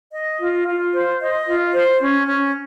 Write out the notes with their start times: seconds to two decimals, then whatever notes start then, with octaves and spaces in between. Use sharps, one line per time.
0.13 D#5
0.39 F4
0.67 F4
0.93 C5
1.20 D#5
1.47 F4
1.73 C5
2.00 C#4
2.27 C#4